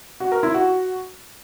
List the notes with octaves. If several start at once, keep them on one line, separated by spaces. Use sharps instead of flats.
F#4
A#4
E4
F#4